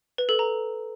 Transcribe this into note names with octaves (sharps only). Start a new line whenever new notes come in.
B4
A4
A#5